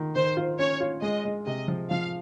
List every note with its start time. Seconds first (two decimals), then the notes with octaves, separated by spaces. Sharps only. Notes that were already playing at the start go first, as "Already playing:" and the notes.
Already playing: D#3 F4
0.15 D#3 C5
0.37 F4
0.59 C#4 C#5
0.80 F4
1.02 G#3 D#5
1.25 G#3
1.46 C3 D#5
1.68 F3
1.90 F3 F5